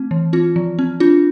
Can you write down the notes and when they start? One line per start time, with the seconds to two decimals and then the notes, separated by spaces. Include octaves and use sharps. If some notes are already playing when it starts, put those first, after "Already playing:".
Already playing: A3 C4
0.11 E3
0.33 C4 F4
0.56 F3
0.79 C4
1.00 D4 F4